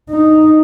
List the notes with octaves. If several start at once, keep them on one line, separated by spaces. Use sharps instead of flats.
D#4